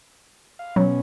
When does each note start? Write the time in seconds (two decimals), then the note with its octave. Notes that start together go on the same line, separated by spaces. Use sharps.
0.59 F5
0.76 B2 F#3 C#4